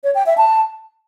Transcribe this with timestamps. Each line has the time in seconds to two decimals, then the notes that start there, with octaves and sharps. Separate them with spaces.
0.04 C#5
0.15 G5
0.26 E5
0.38 A5